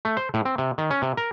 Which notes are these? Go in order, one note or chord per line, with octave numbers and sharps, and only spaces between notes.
A3
C5
A2
C4
C3
D#3
C#4
C3
A#4